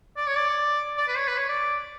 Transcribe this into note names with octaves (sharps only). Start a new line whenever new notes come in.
D5
C#5
D5
D5
B4
C#5
B4
C#5
D5